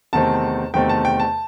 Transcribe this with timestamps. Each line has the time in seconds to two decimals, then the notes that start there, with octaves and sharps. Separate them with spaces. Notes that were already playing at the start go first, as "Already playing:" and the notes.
0.13 E2 C3 D#3 A3 C4 A5
0.74 E2 C3 D#3 A3 C4 G5
0.89 A5
1.05 G5
1.20 A5